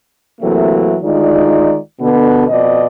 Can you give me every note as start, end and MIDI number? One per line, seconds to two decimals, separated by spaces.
0.41 0.96 48
0.41 0.96 52
0.41 0.96 54
0.41 0.96 57
0.41 0.96 58
1.03 1.77 38
1.03 1.77 51
1.03 1.77 56
1.03 1.77 63
1.03 1.77 65
1.03 1.77 74
2.00 2.45 47
2.00 2.45 50
2.00 2.45 59
2.48 2.86 41
2.48 2.86 47
2.48 2.86 74
2.48 2.86 75